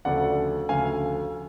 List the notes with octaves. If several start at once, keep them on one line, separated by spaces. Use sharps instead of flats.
D2 C#3 F3 A3 D5 F#5
D2 C#3 F3 A3 F5 G#5